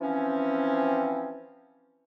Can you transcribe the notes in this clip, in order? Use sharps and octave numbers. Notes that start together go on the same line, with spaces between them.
E3 F3 C4 C#4